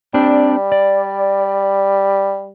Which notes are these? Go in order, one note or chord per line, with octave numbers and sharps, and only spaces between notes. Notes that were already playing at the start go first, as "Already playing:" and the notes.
G3 C4 D4
D5